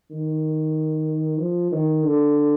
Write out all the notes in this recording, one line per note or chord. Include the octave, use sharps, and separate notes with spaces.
D#3
F3
D#3
D3